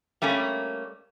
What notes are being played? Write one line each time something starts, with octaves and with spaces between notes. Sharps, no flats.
G3 A3 A#3 C#4